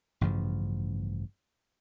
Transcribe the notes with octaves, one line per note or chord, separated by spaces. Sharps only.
A1 G2 C#3 F3